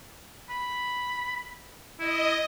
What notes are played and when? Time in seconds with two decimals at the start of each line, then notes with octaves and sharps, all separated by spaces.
0.50 B5
1.99 E4 D#5